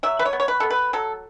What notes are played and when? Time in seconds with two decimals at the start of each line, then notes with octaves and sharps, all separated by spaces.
0.03 F#3 E5
0.19 B4
0.25 C#5
0.33 B3
0.40 C#5
0.48 B4
0.60 B3 A4
0.70 B4
0.93 F#3 A4